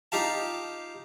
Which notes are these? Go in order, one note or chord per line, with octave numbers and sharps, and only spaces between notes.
D#4 F4 G4 F5 A5